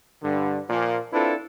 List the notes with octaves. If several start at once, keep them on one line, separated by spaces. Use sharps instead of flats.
G2 D3
A#2 F3
C4 D4 E4 F4 A4 B4